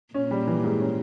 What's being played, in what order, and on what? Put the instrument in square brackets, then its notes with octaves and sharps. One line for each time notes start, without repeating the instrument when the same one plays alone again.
[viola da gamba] A#2 [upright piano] C#4
[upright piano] G3
E3
G#2
C#4